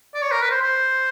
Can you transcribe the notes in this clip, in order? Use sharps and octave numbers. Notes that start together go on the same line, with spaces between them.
D5
C#5
A#4
B4
C5
C5